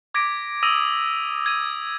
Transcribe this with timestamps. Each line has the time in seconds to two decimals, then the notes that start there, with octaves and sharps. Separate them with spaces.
0.14 D6 G#6 A#6 B6 D7
0.63 D#6 E6 A#6 D#7 F7 F#7
1.46 G#6 D#7